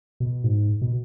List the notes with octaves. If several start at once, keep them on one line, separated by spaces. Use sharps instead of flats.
B2
G#2
B2